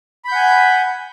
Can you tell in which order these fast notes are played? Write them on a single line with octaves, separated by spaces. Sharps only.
B5 G6 F#5 G#5